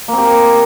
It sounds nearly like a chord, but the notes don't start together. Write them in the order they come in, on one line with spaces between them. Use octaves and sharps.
A#3 C4 G4